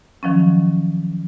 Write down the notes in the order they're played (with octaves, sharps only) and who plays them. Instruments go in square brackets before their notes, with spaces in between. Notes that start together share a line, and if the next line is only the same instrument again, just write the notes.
[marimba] D#3 F3 F#3 C#4